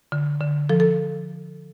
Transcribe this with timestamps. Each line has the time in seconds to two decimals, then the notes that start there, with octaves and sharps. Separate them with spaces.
0.12 D3
0.41 D3
0.69 F3 A4
0.80 A4